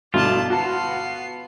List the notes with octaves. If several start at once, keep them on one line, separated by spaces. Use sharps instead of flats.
G1 B2 E4 F4 D5 A5
B3 F#4 A5 C7